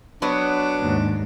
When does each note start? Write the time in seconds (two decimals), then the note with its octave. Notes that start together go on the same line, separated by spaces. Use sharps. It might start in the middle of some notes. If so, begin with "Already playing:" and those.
0.22 F#3 B3 D4
0.79 D#2 G#2